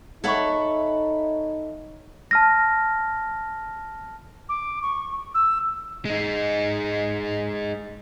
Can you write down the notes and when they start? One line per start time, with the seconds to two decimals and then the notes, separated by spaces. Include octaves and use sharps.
0.24 D#4 A4 C#5 E5 F#5 B5 C#6
2.31 A5 F6 A#6
4.49 D6
4.82 C#6
5.34 E6
6.05 G#3 D#4